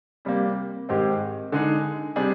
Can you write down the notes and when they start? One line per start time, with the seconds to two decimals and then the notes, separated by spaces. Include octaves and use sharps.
0.25 C3 G3 A#3
0.89 G#2 D#3 G#3 C4 G4
1.52 D3 G#3 D#4 G#4
2.16 C3 G3 D4 G#4